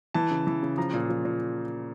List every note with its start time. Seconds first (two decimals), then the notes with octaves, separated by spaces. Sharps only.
0.14 E3 A5
0.31 C#3
0.47 E3
0.63 C#3
0.77 F3 A#5
0.94 A#2
1.09 F3
1.25 A#2